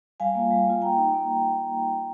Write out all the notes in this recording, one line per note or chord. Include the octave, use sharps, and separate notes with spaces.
G3 F5 G#5
A#3 F4
G3
A#3 F4
A#3 G5 A#5
D#4
A#3
D#4